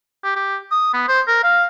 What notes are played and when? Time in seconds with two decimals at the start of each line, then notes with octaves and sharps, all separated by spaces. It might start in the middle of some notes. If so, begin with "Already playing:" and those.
0.24 G4
0.36 G4
0.71 D#6
0.94 B3
1.08 C5
1.28 A#4
1.43 F5